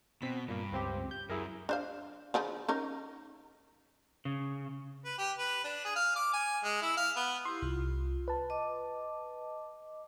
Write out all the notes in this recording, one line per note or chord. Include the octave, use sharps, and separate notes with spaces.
B2 C4 B6
G2 A#2 A#3
C#2 C4 G4
G6
F#2 E4 G#4 A#4
D4 C5 F5
C#3 F3 D4
C#4 D#4 A#4
C#3
B4
G4
B4
D4
G#4
F5
D6
G#5
G#3
E4
F5
B3
E4 G4 C6
C2 F4
B4 A5
D#5 D6